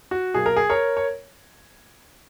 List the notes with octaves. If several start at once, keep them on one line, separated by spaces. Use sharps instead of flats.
F#4
B2 F#3 A#3 G#4
A#4
G#4
A#4 C#5
C#5